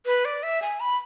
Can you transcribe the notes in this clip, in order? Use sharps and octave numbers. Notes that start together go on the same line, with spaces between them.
B4
D5
E5
G#5
B5